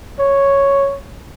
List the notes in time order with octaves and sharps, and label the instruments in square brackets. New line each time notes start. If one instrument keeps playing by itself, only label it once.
[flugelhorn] C#5